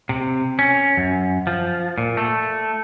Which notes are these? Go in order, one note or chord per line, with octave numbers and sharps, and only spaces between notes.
C3
C#4
F#2
F3
A#2
A3